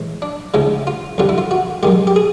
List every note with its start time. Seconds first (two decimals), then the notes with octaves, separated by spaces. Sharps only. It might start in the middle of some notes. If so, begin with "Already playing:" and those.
Already playing: A2 E3 G#3
0.22 D4
0.54 D2 C#3 F3 G#3 E4
0.87 F4
1.18 F2 D3 G3 F4
1.29 E4
1.38 F4
1.51 F#4
1.83 F#2 D#3 G#3 G4
2.07 G4
2.16 G#4